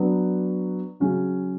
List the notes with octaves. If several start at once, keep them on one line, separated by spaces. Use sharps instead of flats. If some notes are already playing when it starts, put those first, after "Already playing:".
Already playing: F#3 B3 D4
C#3 F#3 C#4 F#4